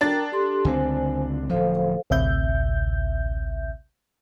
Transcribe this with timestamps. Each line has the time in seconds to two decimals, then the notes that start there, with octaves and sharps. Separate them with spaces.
0.01 D4 A#4 G5 A#5 A6
0.32 G4 A4 C6
0.65 C#2 D3 C4 C5 G#5
1.49 D1 F3 A4 C5 F5
2.10 A1 D2 C3 E5 G6